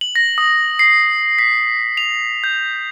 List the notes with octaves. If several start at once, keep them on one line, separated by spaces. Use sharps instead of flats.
F#7
A#6
D#6
C7
B6
F7
G6